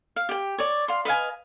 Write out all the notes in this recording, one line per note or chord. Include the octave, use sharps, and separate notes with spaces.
F5
G4 G5
C#5 D5
F5 C6
B4 D#5 F5 G#5